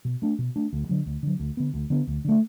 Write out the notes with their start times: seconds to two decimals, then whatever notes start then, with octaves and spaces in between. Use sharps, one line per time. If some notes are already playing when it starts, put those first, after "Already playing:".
0.05 B2
0.22 A3 D4
0.39 B2
0.56 A3 D4
0.73 D2
0.89 D3 F#3
1.06 D2
1.23 D3 F#3
1.40 D2
1.57 D3 B3
1.74 D2
1.90 D3 B3
2.08 D2
2.25 D3 A3